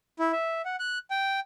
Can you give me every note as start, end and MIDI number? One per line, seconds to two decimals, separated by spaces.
0.19 0.32 64
0.33 0.62 76
0.65 0.76 78
0.80 0.98 90
1.11 1.40 79